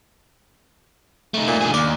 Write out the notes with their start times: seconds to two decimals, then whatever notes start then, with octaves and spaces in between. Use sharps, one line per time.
1.34 A3 D#4
1.48 A#2
1.61 D3 G#4
1.74 D#2 D5